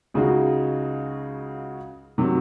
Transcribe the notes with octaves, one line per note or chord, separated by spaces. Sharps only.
C#2 C#3 G#3 D#4 F#4
C3 D#3 F#3